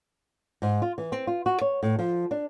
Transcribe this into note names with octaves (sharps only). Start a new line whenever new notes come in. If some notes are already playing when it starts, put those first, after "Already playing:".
G#2
F4
E3
C4
F4
F#4
C#5
A2
F3
D4